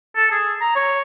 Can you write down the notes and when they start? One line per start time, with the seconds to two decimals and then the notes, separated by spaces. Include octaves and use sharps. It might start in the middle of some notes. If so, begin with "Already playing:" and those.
0.16 A4
0.31 G#4
0.61 A#5
0.76 C#5